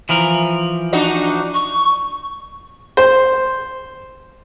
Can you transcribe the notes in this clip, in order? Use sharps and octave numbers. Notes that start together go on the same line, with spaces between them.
E3 F3 A#4
D4 D#4 F#4
C#6
C5